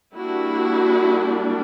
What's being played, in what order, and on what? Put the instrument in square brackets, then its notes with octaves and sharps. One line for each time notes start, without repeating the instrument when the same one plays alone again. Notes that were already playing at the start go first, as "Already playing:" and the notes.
[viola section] G3 A#3 D4 E4 F#4